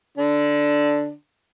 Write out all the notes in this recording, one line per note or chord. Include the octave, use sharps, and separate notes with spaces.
D3 D4